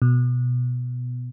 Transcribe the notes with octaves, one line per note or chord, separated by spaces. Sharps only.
B2